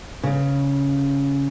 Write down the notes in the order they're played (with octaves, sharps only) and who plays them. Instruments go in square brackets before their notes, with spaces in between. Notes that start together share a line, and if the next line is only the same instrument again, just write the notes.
[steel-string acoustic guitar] C#3